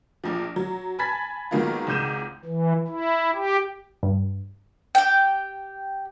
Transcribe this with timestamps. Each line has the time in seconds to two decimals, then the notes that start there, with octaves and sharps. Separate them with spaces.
0.24 A#1 A#2 F3
0.56 F#3
0.99 G#5 A5 B5 G#6 A6 B6
1.51 G#2 D#3 F#3 A#3 B3 F4
1.87 G#1 C#2 G#2 G6 D#7 E7
2.45 E3
2.88 E4
3.35 G4
4.03 G2
4.95 G4 G5